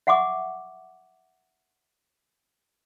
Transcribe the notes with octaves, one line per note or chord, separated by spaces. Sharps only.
E5 F#5 G#5 C#6 D6